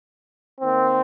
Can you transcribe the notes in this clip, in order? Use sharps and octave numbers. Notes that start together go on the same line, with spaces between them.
D#3 A#3 C4